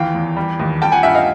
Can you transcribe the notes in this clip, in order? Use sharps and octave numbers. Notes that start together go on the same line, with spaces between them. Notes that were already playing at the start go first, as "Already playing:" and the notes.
Already playing: D#2 E3 F5 G5
E2
G3
D#2
G3 G5 A5
F#5 G#5
G2 E5 F#5
D#5 F5